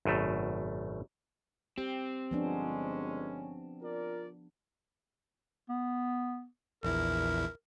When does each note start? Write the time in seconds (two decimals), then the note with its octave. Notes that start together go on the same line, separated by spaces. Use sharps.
0.05 G#1 F#2 B2 A3
1.78 C4 G4
2.31 G1 F3 G#3 B3 C#4 D4
3.83 F4 A#4 D5
5.69 B3
6.83 A#1 E2 E4 A#4